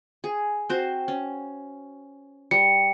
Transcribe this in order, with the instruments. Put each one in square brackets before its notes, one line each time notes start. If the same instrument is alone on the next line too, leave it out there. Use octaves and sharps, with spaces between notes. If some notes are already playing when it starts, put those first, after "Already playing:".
[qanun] G#4
C4 F#4 C5
C#4
[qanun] G3 [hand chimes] C#7